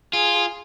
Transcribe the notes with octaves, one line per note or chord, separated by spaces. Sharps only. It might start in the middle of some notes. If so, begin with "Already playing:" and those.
F4 G#4